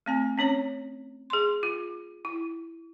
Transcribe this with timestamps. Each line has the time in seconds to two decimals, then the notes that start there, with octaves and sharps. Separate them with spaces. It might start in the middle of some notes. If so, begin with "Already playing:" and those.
0.06 A3 C4 G#5
0.38 C4 C#4 C#5 A#5
1.30 G#4 C6
1.63 F4
2.25 E4